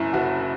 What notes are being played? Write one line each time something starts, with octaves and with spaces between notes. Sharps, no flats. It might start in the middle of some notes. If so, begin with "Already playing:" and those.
Already playing: F#1 F#2 E4
F#1 F#4